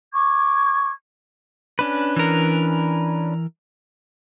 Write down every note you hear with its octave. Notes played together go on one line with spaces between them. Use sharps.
C#6 D6 G#6
C#4 D4 B4
E3 A#4